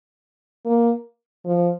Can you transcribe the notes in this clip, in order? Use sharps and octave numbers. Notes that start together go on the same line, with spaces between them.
A#3
F3